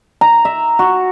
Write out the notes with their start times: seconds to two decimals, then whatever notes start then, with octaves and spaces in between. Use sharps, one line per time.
0.21 A#5
0.45 E5
0.79 F#4